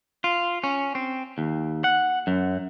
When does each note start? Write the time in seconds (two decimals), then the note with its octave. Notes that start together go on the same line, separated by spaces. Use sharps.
0.24 F4
0.64 C#4
0.95 C4
1.38 D#2
1.84 F#5
2.27 F#2